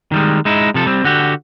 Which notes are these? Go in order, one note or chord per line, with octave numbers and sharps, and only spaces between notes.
D#3 G3 G#3
G#3 D#4 E4
C3 F3 A4
G3 C4
D3 F#4 G4